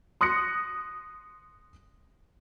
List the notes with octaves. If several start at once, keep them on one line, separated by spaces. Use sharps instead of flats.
C6 D#6 F#6 A#6 C#7